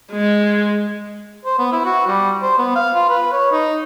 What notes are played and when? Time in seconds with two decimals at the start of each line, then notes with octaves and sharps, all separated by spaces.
0.12 G#3
1.45 C5
1.59 B3
1.72 E4
1.85 F#4
2.07 G3
2.42 C5
2.59 B3
2.76 F5
2.95 F4
3.10 B4
3.32 C#5
3.52 D#4